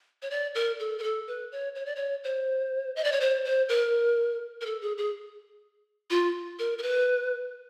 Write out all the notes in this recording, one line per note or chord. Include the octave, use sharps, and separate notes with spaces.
C#5
D5
A#4
A4
A#4
A4
B4
C#5
C#5
D5
C#5
C5
D#5
D5
C#5
C5
C5
A#4
A#4
A4
G#4
G#4
F4
A#4
A#4
B4